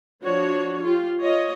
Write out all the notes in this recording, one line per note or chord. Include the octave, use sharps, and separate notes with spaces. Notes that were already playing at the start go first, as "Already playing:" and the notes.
F3 D4 F#4 C#5
F4 G4
F4 C#5 D#5